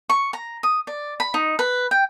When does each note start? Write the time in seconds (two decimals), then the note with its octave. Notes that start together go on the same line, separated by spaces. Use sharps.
0.09 C#6
0.33 A#5
0.63 D#6
0.87 D5
1.20 B5
1.34 D#4
1.59 B4
1.91 G5